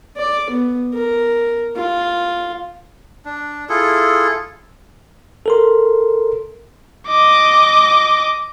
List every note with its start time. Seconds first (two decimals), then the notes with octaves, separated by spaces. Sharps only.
0.17 D5
0.50 B3
0.94 A#4
1.76 F4
3.25 D4
3.69 E4 F4 G#4 A4
5.46 A4 A#4 C6
7.08 D#5 D6